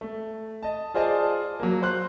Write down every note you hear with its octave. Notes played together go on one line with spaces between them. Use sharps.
A3
D#5 A5
F4 G#4 C5 D5 D#5 A5
F#3 A#3
C5 C6 F#6